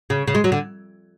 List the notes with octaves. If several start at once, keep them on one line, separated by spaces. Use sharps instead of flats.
C#3
C#3
G#3
F#3
D3